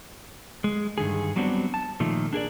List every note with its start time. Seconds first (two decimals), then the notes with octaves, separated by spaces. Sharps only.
0.64 G#3
0.98 G2 D3 D#3 G#4
1.36 F#3 G3 B3 C4 D4 F#4
1.74 A5
2.00 A#2 D#3 F3 A3
2.33 D4 G#4 A#4 D5